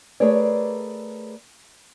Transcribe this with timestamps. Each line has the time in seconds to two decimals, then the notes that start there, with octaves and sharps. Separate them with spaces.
0.20 A3 G#4 A#4 B4 C#5 D5